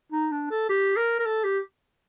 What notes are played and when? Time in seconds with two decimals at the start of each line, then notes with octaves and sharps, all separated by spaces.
0.12 D#4
0.31 D4
0.51 A4
0.69 G4
0.97 A#4
1.19 A#4
1.26 A4
1.44 G4